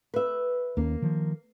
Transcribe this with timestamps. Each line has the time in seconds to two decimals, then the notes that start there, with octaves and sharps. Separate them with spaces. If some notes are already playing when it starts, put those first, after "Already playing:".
0.14 B4 E5
0.77 D#2 A#3 C#4
1.02 D#3 F3